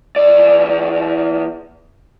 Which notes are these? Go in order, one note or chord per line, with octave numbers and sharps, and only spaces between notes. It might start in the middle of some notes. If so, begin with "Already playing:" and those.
E2 D5